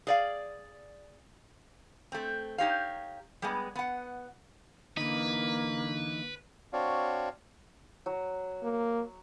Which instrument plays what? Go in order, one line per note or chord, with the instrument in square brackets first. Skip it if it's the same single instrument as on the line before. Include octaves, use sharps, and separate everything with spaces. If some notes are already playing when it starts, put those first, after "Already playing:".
[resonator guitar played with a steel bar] G#4 D5 F5
A3 C4
D#4 G4 C#5 F5
G3 G#3 B3
B3 F#5
[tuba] D3 [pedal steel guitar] E3 D#4 [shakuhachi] A#3 [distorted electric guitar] B4
[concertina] C4 D4 F#4 C#5 D5 F5
[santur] F#3
[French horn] A#3